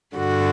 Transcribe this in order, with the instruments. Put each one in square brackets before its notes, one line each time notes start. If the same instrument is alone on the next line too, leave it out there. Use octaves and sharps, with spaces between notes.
[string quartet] G2 D3 F#4